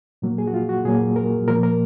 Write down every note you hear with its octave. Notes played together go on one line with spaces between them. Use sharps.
A#2 F#3 A#3
G#4
F#4
F4
F#4
A#2 F#3 A#3 G#4
A#4
A#2 F3 A#3 A#4
A#4